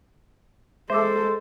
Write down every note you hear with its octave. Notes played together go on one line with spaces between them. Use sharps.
G#3 A4 C5 E5 D6 E6